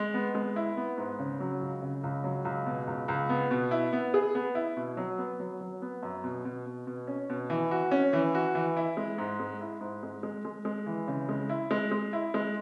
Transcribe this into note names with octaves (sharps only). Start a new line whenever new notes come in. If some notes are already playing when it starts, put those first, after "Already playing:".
Already playing: G#3
B3
G#3
E4
B3
G#2
C#3
F#3
C#2
C#3
C#2
F#3
C#2
B2
C#2
C#2
B3
B2
E4
B3
G#4
B3
E4
B2
F#3
B3
F#3
F#3
B3
F#2
B2
B2
B2
B2
C#4
B2
E3
F#4
C#4
E3
F#4
E3
E4
G#3
G#2
G#3
E4
G#2
G#3
G#3
G#3
G#3
E3
C#3
G#3
E4
G#3
G#3
E4
G#3